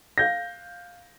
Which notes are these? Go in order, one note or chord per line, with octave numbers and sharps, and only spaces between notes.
F5 G6 A#6